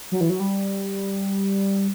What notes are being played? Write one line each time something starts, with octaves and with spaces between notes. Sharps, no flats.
F#3
E3
F#3
G3